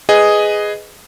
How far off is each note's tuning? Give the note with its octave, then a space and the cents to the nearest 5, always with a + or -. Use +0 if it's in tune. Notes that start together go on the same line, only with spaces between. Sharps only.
G#4 +0 B4 +10 D#5 +0